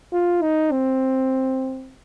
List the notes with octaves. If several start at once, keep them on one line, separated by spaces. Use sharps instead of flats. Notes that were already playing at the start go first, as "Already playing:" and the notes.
F4
D#4
C4